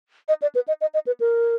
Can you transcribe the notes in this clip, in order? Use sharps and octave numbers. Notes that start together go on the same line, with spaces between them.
D#5
D5
B4
D#5
D#5
D#5
B4
A#4